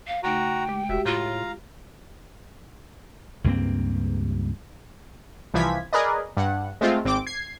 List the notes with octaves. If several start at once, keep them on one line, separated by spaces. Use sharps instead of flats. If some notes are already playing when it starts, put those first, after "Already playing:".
F5
C#3 A3 D#4 F#4 G5 A#5
G#3 G4
E1 F#4 G4 E5
A2 F4 F5 A#5
C#2 G2 A#3 C4
C2 E3 F3 G#6 B6
G#4 A#4 B4 D5 D#5
G2 F#5
G#3 A3 C4 F4
G#1 C4 G5 D6 D7
G#6 C7